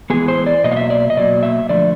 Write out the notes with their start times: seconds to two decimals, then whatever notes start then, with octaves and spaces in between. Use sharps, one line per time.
0.10 E3 G#3 B3 G#4
0.28 C5
0.46 D5
0.64 B2 F#3 A#3 D#5
0.72 F5
0.76 E5
0.90 D5
1.10 D#5
1.17 B2 F#3 A#3 D5
1.43 E5
1.69 D3 F3 A3 D5